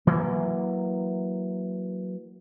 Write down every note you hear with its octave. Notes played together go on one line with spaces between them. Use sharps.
E3 F#3 A#3